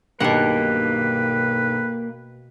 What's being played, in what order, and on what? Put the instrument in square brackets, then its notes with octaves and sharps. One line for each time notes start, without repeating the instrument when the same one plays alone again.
[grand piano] B1 G2 D#3 [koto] B2 F#5 [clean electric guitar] A#3 G4 [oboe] B4